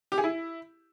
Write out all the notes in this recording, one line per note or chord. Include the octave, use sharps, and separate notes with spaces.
G4
G#4
E4